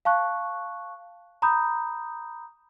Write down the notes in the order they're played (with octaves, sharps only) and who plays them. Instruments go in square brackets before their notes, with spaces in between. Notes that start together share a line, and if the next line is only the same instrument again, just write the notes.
[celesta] F5 A5 C#6 F#6
A#5 B5 D#6 G6